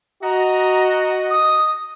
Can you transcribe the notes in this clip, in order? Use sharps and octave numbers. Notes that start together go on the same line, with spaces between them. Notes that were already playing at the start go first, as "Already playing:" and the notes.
F#4 D#5 A#5
D#6